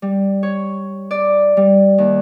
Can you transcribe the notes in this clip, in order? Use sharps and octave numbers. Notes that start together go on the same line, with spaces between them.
G3
C#5
D5
G3
D#2